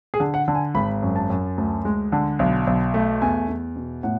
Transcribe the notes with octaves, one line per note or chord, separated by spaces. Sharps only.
G#4
D3
F#5
D3
G#5
G#1 B5
F#2
A5
F#2
D2
G#3
D3
B1
B1
A3
E2 G#5
E2
B2
A2 F#5